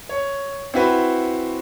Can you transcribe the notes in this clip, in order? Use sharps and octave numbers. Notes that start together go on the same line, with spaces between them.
C#5
C4 E4 F#4 B4